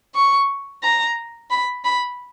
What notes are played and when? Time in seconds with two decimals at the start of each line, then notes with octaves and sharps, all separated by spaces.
0.15 C#6
0.83 A#5
1.51 B5
1.85 B5